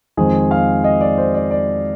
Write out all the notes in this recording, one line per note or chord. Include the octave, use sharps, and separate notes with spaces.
F2 D#3 G#3 C4 G#4
F5
D#5
D5
C5
D5
D5